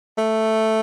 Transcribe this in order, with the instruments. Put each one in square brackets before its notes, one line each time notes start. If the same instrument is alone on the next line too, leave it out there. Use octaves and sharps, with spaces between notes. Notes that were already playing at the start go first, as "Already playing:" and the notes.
[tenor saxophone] A3